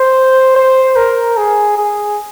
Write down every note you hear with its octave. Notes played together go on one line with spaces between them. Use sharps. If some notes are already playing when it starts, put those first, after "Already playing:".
Already playing: C5
C5
A#4
G#4
G#4